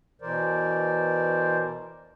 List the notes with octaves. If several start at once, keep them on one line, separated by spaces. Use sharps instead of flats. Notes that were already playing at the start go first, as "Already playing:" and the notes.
B2 E3 A#4 C5 D5